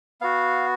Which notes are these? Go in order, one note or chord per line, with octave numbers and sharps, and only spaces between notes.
B3 F#4 F5